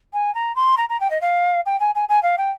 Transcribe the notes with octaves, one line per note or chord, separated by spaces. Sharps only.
G#5
A#5
C6
A#5
A#5
G5
D#5
F5
G5
G#5
G#5
G#5
F5
G5